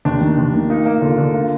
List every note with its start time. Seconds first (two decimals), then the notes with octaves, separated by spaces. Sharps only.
0.05 D#2 D4
0.21 D#3
0.38 D#2
0.54 D#3
0.70 A#3 D#4
0.85 A#3
1.02 D3 F4
1.18 D3
1.34 A#3 F4